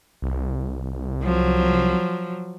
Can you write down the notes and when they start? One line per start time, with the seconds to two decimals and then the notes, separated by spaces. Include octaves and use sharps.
0.22 C2
1.23 F3 F#3